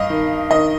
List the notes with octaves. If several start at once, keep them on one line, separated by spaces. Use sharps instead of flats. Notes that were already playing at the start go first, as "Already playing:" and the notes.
Already playing: G2 D#5 F5
D#3
D#3 D#5